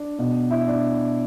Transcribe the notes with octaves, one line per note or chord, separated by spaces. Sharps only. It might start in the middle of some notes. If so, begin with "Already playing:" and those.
Already playing: D4
B2
E4
D4